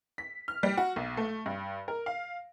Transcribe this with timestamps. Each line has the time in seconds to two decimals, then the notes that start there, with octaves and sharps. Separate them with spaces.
0.18 B6
0.48 F6
0.63 G3
0.77 F#4
0.96 B1
1.17 A3
1.46 G2
1.88 A#4
2.06 F5